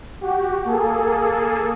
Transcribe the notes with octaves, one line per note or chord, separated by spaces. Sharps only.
F#4 G4
A#3 G#4 A4